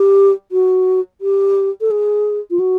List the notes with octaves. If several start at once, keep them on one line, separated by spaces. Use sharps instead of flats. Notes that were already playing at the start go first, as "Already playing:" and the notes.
Already playing: G4
F#4
G4
A4
G#4
F4
F#4